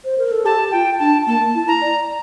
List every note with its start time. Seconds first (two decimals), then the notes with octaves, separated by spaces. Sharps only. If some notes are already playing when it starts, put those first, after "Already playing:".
0.05 C5
0.18 A#4
0.32 A4
0.45 G4 A5
0.72 F4 G5
0.99 D4 A5
1.27 A#3 A5
1.55 E4
1.68 A#5
1.81 D5